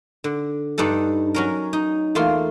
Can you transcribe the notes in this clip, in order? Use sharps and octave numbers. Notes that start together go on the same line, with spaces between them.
D3
G2 D4 D#4 A4
F#3 C#4 A#4
D#4
E2 A3 A#3 F4 C6